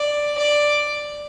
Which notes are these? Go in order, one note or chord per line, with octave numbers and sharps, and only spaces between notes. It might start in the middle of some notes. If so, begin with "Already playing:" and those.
Already playing: D5
D5